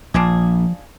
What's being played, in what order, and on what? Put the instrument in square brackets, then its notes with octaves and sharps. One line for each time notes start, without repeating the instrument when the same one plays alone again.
[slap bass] A#1 [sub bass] F3 [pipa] D4 F4 G#4